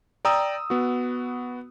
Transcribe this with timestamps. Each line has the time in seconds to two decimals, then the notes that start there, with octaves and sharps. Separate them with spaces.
0.25 D5 G5 A#5 D#6 E6
0.70 B3 F#4